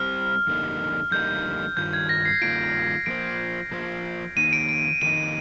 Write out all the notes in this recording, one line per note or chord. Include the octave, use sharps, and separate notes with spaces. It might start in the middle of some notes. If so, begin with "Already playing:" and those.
Already playing: G3 C4 G4 C5 F6
F2 D3 G3 A#3 D#4
F2 D3 G3 A#3 D#4 G6
G2 D#3 F4 G6
G#6
A#6
C7
G2 D#3 G3 A#3 F4 D7
F3 A#3 F4 C5 D7
F3 A#3 F4 C5
F2 D#3 A#3 D#4 D#7
D7
D7
F2 D#3 A#3 D#4 D#7